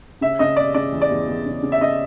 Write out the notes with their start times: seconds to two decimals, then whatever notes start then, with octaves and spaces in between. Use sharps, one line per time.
0.21 C#3 E5
0.39 C#3 D#5
0.57 E1 D5
0.74 C#3 D5
0.93 E2
1.02 D5
1.11 E2
1.28 E2
1.46 C#3
1.62 C#3
1.72 E5
1.81 C#3 D#5